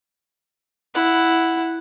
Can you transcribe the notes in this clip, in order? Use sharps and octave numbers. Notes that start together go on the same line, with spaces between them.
E4 F#5